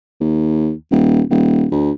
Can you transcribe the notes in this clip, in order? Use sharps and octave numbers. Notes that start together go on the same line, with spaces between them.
D#2
D#1
D#1
D2